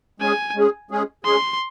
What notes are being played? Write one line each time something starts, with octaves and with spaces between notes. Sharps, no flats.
G#3 C#4 G#4 G#5
G#3 C#4 G#4
G#3 C#4 G#4
G#3 C#4 G#4 C6